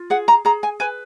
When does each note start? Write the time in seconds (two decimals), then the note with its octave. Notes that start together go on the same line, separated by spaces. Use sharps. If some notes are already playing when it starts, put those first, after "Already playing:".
Already playing: F4
0.10 G#4 F#5
0.28 A#5
0.45 G#4 A#5
0.63 G#5
0.80 B4 G#5